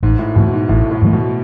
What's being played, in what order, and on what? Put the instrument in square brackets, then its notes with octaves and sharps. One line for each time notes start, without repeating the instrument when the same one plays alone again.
[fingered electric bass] A1 [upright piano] G#2
[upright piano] A2
[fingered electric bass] G#2 E3 A3 [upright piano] B2
[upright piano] G#2
[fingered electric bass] A1 [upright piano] A2
[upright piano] A2
[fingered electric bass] G#2 E3 A3
[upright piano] B2